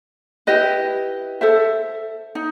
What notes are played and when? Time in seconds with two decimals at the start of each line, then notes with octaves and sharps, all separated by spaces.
0.47 E4 G4 B4 D#5
1.41 A4 C5 E5
2.35 D#4